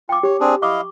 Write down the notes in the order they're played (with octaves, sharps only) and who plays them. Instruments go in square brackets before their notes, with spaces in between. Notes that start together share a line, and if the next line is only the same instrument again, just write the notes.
[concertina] F4 [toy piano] G5 D6
[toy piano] G4 [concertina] C#5
[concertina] C4 D4 G#4
[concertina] E4 D#5 F5 [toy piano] C#6 D6